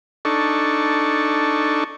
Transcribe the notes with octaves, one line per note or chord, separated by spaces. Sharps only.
D4 D#4 A4 C#6